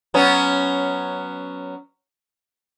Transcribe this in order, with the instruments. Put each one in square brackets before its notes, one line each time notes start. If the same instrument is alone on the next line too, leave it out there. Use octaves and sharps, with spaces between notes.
[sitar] F#3 B3 C#4